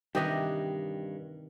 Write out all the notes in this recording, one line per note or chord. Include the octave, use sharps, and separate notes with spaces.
G2 C3 D#3 E3 G4 D#5